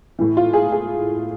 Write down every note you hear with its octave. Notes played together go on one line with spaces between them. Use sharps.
A2 E3
F4
G#4
G#4